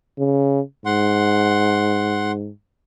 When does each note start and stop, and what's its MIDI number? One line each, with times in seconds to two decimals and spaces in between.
0.18 0.60 49
0.86 2.50 44
0.86 2.32 78
0.86 2.32 84